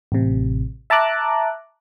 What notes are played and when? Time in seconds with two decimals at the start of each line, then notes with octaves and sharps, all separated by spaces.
0.12 A1 C3
0.90 E5 A5 A#5 D6 F#6